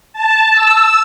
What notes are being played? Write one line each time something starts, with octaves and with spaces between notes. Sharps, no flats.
A5
E6